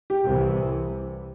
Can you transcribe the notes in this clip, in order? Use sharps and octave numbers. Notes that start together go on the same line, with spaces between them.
G4
C2 C3 E3